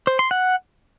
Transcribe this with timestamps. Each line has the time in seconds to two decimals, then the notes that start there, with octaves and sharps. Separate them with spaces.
0.07 C5
0.19 C6
0.31 F#5